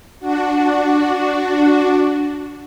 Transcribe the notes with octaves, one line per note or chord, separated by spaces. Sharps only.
D4 F#4